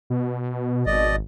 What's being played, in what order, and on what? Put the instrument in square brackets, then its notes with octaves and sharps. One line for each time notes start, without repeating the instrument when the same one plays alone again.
[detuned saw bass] B2
[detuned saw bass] G#1 [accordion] B2 D5 D#5